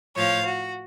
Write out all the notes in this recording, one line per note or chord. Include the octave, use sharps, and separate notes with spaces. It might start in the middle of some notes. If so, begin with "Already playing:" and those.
A2 F3 C#5 F5
F#4